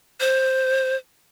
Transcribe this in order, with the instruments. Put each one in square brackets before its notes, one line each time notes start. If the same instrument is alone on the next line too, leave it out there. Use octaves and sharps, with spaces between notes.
[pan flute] C5